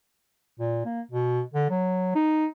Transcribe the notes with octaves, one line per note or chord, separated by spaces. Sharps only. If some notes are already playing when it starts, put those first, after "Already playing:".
A#2
A#3
B2
D3
F#3
D#4